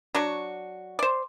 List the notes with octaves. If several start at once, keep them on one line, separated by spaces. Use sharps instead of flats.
F#3 D4 F#4
C5 D5